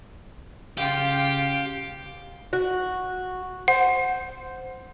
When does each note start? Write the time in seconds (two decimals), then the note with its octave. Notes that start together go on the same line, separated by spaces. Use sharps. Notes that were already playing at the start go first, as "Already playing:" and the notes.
0.78 C#3 F4 G4 F5 G5
2.53 F#4
3.68 C5 F#5